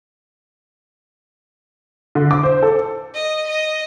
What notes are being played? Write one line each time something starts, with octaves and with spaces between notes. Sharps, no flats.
D3
D6
C5
A4
D#5
D#5